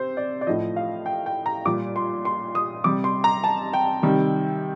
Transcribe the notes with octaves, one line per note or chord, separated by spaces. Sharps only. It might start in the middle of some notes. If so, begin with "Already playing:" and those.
Already playing: C3 C5
D5
D5
A2 F3 D#5
F5
G5
G5
A#5
A#2 G3 D6
C6
C6
D#6
C3 G3 D6
C6
A#5
A5
G5
C3 D#3 G3